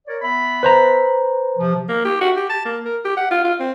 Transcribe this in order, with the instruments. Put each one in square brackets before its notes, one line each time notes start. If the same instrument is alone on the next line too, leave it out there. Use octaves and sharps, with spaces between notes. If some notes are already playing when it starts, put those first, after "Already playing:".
[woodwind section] A#4 C#5 D5
B3 E5 B5
[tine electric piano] B4 C5 A#5
[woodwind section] C3 F3
[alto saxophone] A#3
G4
F#4
G4
A5
A#3
A#4
G4
F#5
F4
F4
C4